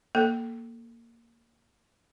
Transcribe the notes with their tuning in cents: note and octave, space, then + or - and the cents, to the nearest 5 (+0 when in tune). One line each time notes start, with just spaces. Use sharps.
A#3 +0 A4 +0